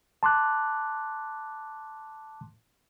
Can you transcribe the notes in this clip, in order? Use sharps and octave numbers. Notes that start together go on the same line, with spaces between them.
A5 C6 D6 F#6